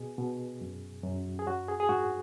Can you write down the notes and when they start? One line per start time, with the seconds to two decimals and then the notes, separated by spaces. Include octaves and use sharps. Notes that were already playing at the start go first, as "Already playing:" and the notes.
Already playing: B2 G#4
0.18 B2
0.61 F#2
1.04 F#2
1.39 G#4
1.46 F#3 F#4
1.68 G#4
1.80 G#4
1.89 G#2 F#4